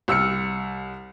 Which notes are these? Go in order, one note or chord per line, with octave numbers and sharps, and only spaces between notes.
C2 E6 F6 C#7